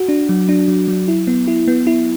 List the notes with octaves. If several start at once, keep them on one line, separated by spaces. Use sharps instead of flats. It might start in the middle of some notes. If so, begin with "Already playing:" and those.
Already playing: F#4
D4
F#3
D4
F#3
F#3
E4
B3
E4
B3
E4